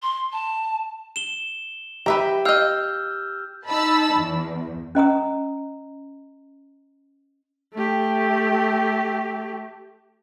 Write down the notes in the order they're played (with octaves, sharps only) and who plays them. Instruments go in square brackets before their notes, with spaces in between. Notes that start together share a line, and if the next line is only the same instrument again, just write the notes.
[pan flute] C6
A5
[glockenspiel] E7 G7
[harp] G4 [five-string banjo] B4 E5 A#5
[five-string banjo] D#5 F5 [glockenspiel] E6 F6 G6
[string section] D#4 A5 B5 E6
E2
[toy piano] C#4 D#5 A#5 D#6
[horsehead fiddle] A3 G4